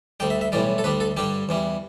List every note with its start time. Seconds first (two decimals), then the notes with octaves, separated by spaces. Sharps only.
0.20 D2 D3 G3 G5
0.30 E5
0.41 E5
0.52 B1 A2 E3 G3 D5
0.78 A4
0.84 D2 D3 G3 B4
1.00 A4
1.17 G2 D3 G3 G4
1.49 E2 E3 G3